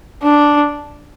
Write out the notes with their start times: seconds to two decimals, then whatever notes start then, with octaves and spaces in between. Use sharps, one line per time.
0.22 D4